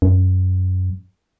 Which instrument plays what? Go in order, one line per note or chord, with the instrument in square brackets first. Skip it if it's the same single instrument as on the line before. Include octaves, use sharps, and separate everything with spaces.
[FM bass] F#2